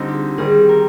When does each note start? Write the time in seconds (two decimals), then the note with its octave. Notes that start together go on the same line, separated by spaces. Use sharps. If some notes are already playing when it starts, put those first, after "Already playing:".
Already playing: D3 G3 C4 D#4 F4
0.08 G4
0.38 D#3 G3 C4 G#4
0.69 A#4